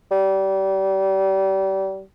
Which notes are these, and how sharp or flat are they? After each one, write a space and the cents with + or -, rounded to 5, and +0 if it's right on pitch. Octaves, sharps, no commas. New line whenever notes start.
G3 -30